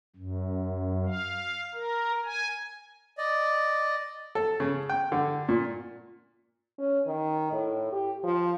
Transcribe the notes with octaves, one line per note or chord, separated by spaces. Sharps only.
F#2
F5
A#4
G#5
D5 D#5
A4
C#3
G5
D3
A#2
C#4
D#3
A2
G4
F3